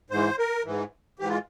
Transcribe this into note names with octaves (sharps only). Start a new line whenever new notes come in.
G#2 E3 C5
A#4
G#2 E3
G#2 E3 G4
F4